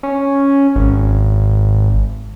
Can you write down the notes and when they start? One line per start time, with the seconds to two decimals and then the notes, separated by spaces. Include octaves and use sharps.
0.03 C#4
0.76 G#1